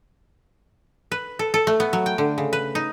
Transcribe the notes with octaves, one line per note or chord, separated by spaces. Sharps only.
B4
A4
A4
A3
B3
F#3
G5
D3
C#3
B4
D#4